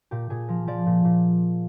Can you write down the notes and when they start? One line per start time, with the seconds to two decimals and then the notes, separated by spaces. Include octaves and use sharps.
0.11 A#2 G4
0.30 A#2 G#4
0.48 F3 A#4
0.67 F3 D5
0.86 A#2
1.05 A#2